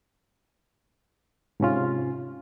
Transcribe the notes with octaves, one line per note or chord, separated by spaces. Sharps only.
G#2 C3 C#4 F4